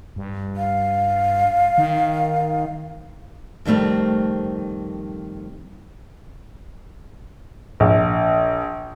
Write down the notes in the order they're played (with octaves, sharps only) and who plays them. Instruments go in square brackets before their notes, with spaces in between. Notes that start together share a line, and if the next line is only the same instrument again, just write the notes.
[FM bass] G2
[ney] F5
[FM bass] D#3
[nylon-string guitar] F2 D#3 G3 A3 C4
[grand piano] A#1